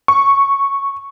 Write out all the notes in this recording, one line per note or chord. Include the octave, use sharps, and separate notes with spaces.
C#6